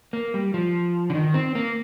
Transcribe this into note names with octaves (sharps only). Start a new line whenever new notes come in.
A#3
G3
F3
D3
D#3
C4
A#3